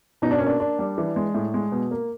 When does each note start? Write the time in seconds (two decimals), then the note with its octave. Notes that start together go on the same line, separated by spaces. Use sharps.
0.22 B2 D#4
0.31 D4
0.38 A#3 C#4
0.47 D4
0.60 A#3 D4
0.79 G3
0.98 E3
1.16 G#3
1.34 A2
1.54 G#3
1.72 B2
1.91 A#3